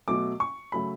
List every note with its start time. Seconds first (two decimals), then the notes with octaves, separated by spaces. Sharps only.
0.08 B2 F#3 A3 D6
0.40 C#6
0.72 C#3 F#3 A3 B5